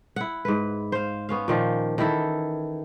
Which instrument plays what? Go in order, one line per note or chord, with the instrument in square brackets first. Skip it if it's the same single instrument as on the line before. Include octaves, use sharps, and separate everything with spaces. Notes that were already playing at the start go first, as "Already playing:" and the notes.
[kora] E4 F#5
G#2 B4
C5 F5
B3 C#4 F5
A#2 D#3 F3
D#3 E3 E4 A4